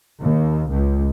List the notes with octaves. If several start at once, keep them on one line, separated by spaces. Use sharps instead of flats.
D#2
C#2